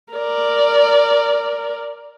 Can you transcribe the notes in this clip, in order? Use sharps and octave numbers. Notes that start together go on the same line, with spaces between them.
A#4 D5